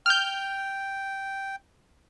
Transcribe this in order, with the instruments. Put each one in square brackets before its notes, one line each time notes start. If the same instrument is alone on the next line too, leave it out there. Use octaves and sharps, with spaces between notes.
[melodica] G5 [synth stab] F6 G6